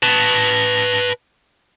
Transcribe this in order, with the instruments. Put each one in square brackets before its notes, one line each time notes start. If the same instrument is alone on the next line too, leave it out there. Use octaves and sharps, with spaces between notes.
[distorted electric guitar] B4 A5